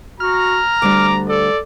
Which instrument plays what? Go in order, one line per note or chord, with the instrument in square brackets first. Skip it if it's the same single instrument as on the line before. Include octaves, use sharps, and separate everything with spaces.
[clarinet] F#4 [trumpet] A#5 [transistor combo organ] F6
[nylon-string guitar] D2 G3 D4 [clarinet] D6
[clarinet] A4 [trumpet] D5